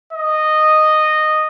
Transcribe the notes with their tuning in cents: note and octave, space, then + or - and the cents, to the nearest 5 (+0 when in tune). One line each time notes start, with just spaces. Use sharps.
D#5 -10